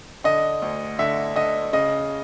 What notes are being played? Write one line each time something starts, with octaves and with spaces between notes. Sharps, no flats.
D3 D#5
D2
D3 E5
D3 D#5
C#3 D#5